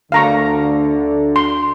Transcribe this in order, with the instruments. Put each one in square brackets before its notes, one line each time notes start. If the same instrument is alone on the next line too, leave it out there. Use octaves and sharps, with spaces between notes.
[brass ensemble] D2 D3 [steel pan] F5 A#5 C#6
[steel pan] C6